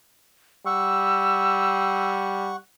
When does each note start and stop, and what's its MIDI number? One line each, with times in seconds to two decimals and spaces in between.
0.66 2.56 55
0.66 2.56 78
0.66 2.56 85
0.66 2.11 88